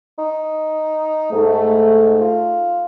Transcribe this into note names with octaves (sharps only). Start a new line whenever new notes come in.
D#4
G#2 A3 D#4
F4